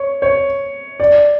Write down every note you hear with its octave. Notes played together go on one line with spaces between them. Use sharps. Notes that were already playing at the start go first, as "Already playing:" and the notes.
Already playing: C#5
C#5
D5